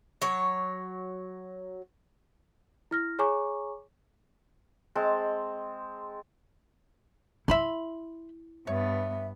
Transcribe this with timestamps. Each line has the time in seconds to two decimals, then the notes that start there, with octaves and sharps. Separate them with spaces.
0.22 F#3 C#5
2.91 E4 F6 A#6
3.19 G#4 C#5 G#5 A#5 C#6 D6
4.95 G#3 C4 A5
7.48 E4 E5 B5 C6
8.67 G2 B3 C#5 E5